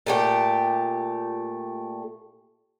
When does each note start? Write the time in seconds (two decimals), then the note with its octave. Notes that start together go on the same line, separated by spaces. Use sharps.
0.07 A#2 A3 G4